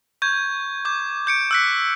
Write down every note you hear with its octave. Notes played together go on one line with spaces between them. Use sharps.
C#6 G6 G#6
D6 G6
G6 C#7 D7
E6 F#6 B6